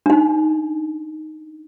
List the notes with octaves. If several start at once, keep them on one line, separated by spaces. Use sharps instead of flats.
D4 D#4